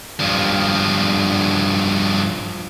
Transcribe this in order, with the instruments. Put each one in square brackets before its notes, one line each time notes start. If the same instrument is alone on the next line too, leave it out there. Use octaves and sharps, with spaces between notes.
[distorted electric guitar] G2 F3